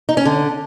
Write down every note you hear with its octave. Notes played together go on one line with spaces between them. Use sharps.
D#4
C#4
D3